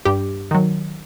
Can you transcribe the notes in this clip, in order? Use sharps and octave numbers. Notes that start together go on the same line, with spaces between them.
G2 G4
D#3 F#3